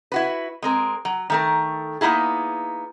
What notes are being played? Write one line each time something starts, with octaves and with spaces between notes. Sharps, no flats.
E4 F#4 B4
G#3 C4 A#4
F#3
D#3 A3 A#4
A#3 B3 D#4 E4 G#4